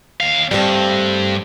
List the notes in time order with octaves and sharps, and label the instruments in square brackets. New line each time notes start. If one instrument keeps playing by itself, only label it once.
[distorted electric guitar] D#2 F5
[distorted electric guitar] G2 [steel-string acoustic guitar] G3 A3 C4